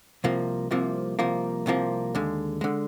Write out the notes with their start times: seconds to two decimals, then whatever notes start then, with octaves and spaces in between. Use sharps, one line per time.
0.24 C2 C3 F3 A#3
0.71 C2 C3 F3 A#3
1.19 C2 C3 F3 A#3
1.66 C2 C3 F3 A#3
2.15 D#2 D3 G#3
2.61 D3 G#3